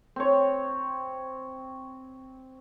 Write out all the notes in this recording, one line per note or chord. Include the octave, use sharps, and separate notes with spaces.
C4 C#5